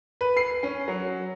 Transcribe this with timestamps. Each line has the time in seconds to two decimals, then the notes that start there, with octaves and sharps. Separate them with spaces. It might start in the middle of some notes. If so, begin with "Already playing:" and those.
0.21 B4
0.37 C7
0.63 C#4
0.88 F#3